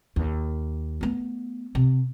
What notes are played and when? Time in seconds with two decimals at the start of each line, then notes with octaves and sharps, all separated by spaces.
0.16 D#2
1.01 A3 B3
1.75 C3